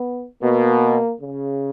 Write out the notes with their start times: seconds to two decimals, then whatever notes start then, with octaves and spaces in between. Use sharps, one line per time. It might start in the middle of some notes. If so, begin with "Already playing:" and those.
Already playing: B3
0.42 B2 A#3
1.21 C#3